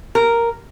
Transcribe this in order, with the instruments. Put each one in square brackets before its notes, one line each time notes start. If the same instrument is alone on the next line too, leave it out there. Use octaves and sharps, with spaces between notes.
[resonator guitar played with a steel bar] A#4